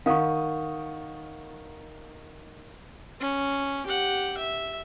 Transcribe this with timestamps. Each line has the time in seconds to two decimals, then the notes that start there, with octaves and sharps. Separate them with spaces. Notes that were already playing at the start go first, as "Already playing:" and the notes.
0.06 D#3 F5 F#5 C#6 D#6
3.20 C#4
3.87 G4 F#5
4.38 E5